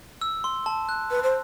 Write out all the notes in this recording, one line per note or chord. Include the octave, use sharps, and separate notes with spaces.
E6
C6
A5
F#6
B4
C5